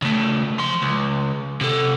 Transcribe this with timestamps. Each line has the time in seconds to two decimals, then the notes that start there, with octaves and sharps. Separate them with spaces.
0.02 C#3 A3
0.59 F3 C6
0.82 C#2
1.61 C3 A4